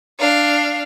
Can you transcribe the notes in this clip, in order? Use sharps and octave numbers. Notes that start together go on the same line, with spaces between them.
D4 F5